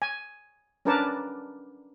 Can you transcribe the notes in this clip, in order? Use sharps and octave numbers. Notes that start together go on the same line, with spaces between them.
G#5
C#4 D4 A#4 B4 D5 A5